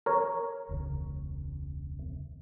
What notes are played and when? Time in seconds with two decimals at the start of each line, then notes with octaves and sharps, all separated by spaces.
0.06 A#4 C#5
0.69 E1 C#2 C#3